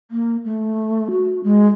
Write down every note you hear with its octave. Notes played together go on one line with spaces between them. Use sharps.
A#3
A3
F#4
G#3